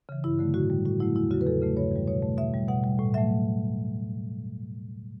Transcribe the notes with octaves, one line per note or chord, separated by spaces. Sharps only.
C#3 E3
G2 E4
D3 F#3 A3
A2 F#4
G3
A2 F#4
F#3 A3 E4
E2 E4
C#3 F#3 F#4
B4
E2 A4
C#3 F#3 A3
G2 C#5
E3 G3
B2 C#5
A3
B2 E5
G3
B2 F#5
G3
A2
F#3 A3 E5